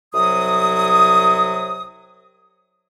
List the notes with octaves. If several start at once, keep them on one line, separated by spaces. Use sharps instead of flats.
C2 C3 F#3 D#6